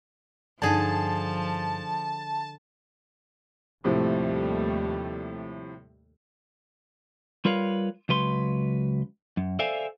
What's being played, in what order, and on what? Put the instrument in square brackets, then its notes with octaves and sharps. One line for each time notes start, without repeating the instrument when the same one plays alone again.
[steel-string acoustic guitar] G2 D#4 [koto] D3 G#4 [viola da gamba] F3 [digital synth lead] A5
[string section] D#2 G3 A3 [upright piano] A2 C3 F3
[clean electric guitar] G3 F4 A#4 B4 C#5 F5
C#2 F#3 B4 C6
F#2
A4 C5 D5 E5 F5 G#5